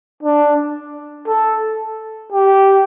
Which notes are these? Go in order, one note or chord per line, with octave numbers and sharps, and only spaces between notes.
D4
A4
G4